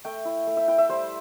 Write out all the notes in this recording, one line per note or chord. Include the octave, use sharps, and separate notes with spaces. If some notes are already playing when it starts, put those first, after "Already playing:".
A3 G5
E4
A3
E5
E4 G5
E5
G3 C5